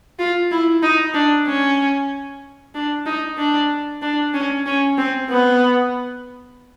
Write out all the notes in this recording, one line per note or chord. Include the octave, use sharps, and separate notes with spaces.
F4
E4
D#4
D4
C#4
D4
D#4
D4
D4
C#4
C#4
C4
B3